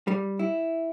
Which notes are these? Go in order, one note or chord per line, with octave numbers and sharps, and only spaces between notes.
G3
E4